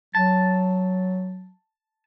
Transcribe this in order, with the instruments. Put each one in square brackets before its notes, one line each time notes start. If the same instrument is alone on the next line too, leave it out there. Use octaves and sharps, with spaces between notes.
[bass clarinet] F#3 [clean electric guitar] A5